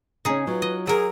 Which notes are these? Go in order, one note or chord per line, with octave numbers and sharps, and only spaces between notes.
C#3 C#4 D#4 G#4
F#3 F4 B4
D#5
F#3 G#4 A#4